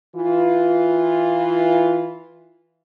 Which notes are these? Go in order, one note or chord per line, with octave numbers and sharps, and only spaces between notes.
E3 F4